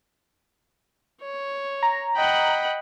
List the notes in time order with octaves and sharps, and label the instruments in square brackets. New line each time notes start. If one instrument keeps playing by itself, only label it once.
[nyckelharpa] C#5
[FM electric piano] A#5
[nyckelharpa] D#5 F#5 [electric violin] G5 B5